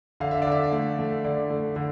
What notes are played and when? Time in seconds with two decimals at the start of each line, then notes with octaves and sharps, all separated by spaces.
0.20 D3 F5
0.31 E5
0.42 D5
0.47 D3 E5
0.73 A3
0.99 A3
1.24 D3 D5
1.50 A3
1.76 D3